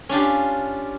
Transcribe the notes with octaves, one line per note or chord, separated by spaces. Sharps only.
C#4 D4 F4 G4